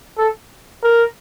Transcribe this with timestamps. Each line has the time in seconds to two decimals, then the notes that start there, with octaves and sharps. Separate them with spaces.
0.17 A4
0.84 A#4